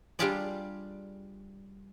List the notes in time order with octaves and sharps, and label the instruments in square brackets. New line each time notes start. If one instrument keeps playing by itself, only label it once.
[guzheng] G3 D4 F4 G4 G#4 D5